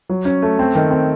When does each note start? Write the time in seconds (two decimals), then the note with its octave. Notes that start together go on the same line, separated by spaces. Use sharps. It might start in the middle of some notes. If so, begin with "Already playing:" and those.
0.09 F#3
0.25 C#4
0.42 A3
0.59 C4
0.75 D#3
0.91 C4